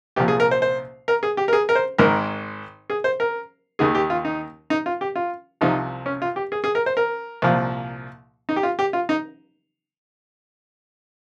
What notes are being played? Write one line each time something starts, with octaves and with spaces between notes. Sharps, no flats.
C2 A#2 F3 G4
G#4
A#4
C5
C5
A#4
G#4
G4
A#4
G#4
A#4
C5
G#1 G#2 D#3 A#4
G#4
C5
A#4
D#2 D#3 G#4
G4
F4
D#4
D#4
F4
G4
F4
C2 C3 F3 D#4
C#4
F4
G4
G#4
G#4
A#4
C5
A#4
C2 A#2 F3
D#4
G4
F4
G4
F4
D#4